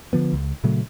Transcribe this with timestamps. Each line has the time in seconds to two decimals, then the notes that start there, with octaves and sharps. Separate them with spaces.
0.13 D3 F3 B3
0.33 C#2
0.64 A#2 C#3 F#3 A3